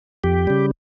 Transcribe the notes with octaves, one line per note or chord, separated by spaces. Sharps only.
F2 G4
C#3 G3